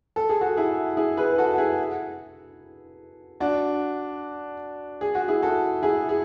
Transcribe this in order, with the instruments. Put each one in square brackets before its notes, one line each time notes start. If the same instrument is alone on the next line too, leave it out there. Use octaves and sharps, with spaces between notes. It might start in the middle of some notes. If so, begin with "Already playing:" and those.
[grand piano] A4
G#4
F#4 A4
E4 G#4
E4 G#4
G#4 B4
F#4 A4
F#4
E4 G#4
D4 F#4
G#4
F#4
E4 G#4
F#4 A4
E4 G#4
G#4